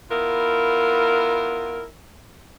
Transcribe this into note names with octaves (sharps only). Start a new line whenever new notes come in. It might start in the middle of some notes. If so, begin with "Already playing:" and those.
B3 E4 F4 A#4